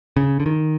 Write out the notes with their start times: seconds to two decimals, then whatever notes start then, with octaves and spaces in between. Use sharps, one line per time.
0.17 C#3
0.40 D3
0.46 D#3